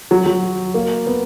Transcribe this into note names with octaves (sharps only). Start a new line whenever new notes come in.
F#3
F#3
A#3
B3